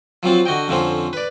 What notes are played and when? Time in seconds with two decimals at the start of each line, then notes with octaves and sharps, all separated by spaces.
0.23 F3 F#3 C4 F4
0.46 D3 F#4 D#5 G5
0.68 F2 D3 F3 C4 C#4
1.13 B4 D5